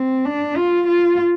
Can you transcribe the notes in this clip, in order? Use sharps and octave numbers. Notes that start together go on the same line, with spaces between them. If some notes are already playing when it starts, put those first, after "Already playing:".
Already playing: C4
D4
F4
F4